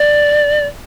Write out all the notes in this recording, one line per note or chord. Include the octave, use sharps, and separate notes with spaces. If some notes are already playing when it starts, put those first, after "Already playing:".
Already playing: D5